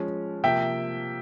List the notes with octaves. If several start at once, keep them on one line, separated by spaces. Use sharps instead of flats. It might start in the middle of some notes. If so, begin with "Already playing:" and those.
Already playing: F3 G#3 C#4
C3 F3 A#3 E5 G5